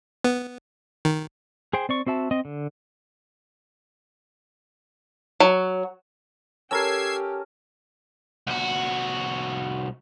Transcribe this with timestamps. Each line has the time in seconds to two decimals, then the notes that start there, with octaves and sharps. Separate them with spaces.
0.24 B3
1.05 D#3
1.73 G#4 C5 G5
1.89 C4 D5 C#6
2.07 C4 F#4 E5 A5
2.31 C4 D#5 D#6
2.45 D3
5.40 F#3
6.71 C#4 G4 A4 A#4 E6 G#6 C7
8.47 C2 F#4